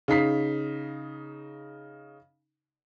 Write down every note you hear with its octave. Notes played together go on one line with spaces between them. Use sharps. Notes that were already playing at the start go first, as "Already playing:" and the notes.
C#3 D#4 B6 C7